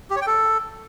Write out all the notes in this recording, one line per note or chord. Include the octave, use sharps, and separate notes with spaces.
G4
C#5
G5
A4